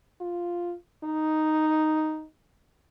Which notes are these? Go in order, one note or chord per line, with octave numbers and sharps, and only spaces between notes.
F4
D#4